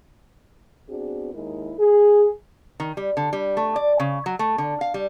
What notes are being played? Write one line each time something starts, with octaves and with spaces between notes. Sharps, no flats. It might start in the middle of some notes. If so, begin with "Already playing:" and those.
B3 C4 D4 F#4 G#4
D#2 G#3 D#4 E4 A#4
G#4
D#3
G3
D3
G3
A3
D5
C#3
F#3
A3
D3
F5
G3